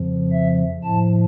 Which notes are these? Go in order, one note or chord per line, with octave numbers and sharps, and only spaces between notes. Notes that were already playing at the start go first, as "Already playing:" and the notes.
Already playing: F2 C#3 F3
E5
A2 F3 A5